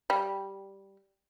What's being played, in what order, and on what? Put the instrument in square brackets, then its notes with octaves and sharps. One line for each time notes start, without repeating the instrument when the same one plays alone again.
[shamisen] G3